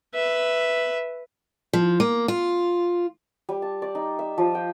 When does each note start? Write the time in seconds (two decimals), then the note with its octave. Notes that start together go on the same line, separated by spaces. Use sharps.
0.15 B4 E5
1.73 F3
2.00 A#3
2.28 F4
3.49 G3
3.62 A5
3.82 D5
3.95 D#4
4.19 E5
4.38 F3
4.55 G5